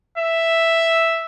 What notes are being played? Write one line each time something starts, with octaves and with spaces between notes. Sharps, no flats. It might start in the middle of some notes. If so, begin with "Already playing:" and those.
E5